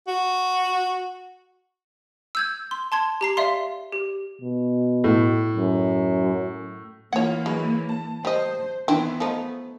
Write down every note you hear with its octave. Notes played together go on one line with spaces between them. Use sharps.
F#4
E6 G6 G#6
C6
A5 C6 G#6
G4 A#5 C7
D5 E5 F5 C6
G4
B2
A2
F#2
E3 A#3 F4 C#5 F#5 G#6
F#3 G#3 B4 C#5
A5
G3 C5 D#5
D#3 E3 B3 C4 E4
F3 A3 D#4